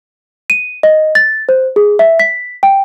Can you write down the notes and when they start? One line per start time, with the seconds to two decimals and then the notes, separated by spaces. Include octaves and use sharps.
0.50 D#7
0.83 D#5
1.15 A6
1.49 C5
1.76 G#4
1.99 E5
2.20 B6
2.63 G5